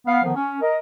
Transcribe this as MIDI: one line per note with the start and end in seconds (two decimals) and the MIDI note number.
0.06 0.21 59
0.06 0.21 77
0.22 0.33 50
0.22 0.33 51
0.22 0.33 53
0.22 0.33 59
0.34 0.56 61
0.60 0.77 70
0.60 0.77 75